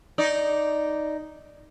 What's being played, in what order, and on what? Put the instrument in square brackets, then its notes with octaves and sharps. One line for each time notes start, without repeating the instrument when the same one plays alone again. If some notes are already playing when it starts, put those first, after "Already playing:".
[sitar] D#4 D5